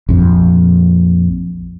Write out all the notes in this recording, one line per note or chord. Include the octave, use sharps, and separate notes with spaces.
A#1 F2